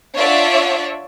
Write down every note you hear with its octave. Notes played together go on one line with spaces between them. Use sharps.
D4 F4 C#5 D5 E5 F#5